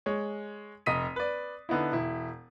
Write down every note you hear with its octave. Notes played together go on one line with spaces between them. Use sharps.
G#3 C#5
F1 D#5 D#6 B6 D#7
B4 D5
D3 B3 D#4 E4
E1 E4